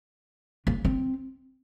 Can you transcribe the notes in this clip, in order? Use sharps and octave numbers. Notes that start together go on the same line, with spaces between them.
A#3
C4